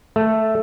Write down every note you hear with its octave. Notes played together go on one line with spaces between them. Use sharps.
A3